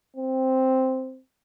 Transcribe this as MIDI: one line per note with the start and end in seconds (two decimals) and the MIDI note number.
0.17 1.19 60